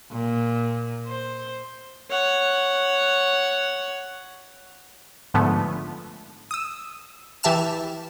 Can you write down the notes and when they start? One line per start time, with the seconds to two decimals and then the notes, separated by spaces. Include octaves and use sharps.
0.12 A#2
1.07 C5
2.10 C#5 F#5
5.34 G#2 D3 F3 A3 B3
6.51 D#6 E6
7.43 E3 G4 E5 A5 F6 E7